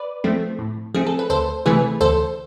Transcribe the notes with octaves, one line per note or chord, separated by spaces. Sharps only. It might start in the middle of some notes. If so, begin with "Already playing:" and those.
Already playing: B4 D5
F3 A3 C4
A2
F3 A3 C4 G#4
A4
B4
D2 A4 C5
C3 E3 A3 G#4 B4
D2 A4 C5